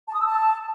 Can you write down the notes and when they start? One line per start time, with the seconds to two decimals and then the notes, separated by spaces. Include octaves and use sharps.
0.08 A5
0.14 D#6
0.20 E6
0.26 A5